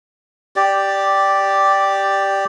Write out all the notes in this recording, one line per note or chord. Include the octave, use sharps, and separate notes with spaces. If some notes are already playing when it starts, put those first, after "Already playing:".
G4 D5